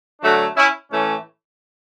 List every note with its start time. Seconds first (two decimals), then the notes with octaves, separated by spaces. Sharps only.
0.21 D3 F#3 A3 D4 F#4
0.56 C#4 E4
0.91 A2 E3 A3 C#4